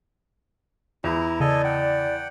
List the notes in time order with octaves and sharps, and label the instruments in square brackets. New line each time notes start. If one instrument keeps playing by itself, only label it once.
[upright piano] E2 [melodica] E4 A#5
[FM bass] C#3 [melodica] A4 D#5 G#5 [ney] D5
[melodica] F#5 G5